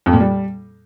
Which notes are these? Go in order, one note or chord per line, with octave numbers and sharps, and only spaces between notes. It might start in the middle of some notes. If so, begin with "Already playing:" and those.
F2
A#2
G3